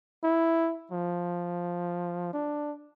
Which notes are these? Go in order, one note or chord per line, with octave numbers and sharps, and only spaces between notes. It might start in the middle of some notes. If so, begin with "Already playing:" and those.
E4
F3
D4